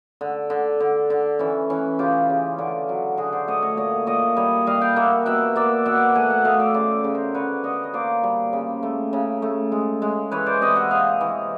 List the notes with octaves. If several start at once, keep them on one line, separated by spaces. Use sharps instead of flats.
D3
D3
D3
D3
E3 C#4
E3 C#4
C#3 F4 G4
C#3
D3
F#3
D3 F#4 G#4
C5 D5
A3 C#5 D#5
C#5 D#5
A#2 C#5 D#5
A#2 C#5 D#5
G3 C#5 D#5
G3 D#5 F5
F5 G5
A#3 E5 F#5
B2 E5 F#5
A#3 D5 E5
B2 E5 F#5
A3 F#5 G#5
E5 F#5
A3 D#5 F5
D5 E5
C#3 C5 D5
C#3
A#4 C5
D3 B4 C#5
D3 C#5 D#5
D#5
A#3 C5 D5
G3
C#3
A3
C#3
A3
G#3
G#3
E3 B4 C#5
C5 D5
C3 C#5 D#5
E5 F#5
C3 D#5 F5
E3